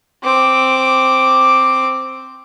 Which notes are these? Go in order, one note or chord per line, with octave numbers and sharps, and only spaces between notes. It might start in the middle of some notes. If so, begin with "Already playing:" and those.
C4 D6